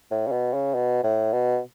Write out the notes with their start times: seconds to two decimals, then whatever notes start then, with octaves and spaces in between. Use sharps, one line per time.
0.11 A2
0.27 C#3
0.32 B2
0.54 C#3
0.75 B2
1.04 A2
1.33 B2